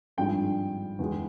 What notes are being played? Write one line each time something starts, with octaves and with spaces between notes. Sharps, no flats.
G#1 G2 F3 G#3 G5
E2 E3 G#3